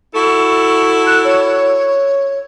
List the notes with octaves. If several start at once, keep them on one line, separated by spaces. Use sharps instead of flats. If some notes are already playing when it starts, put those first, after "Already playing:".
E4 F#4 A4 C#6
F#6
C#5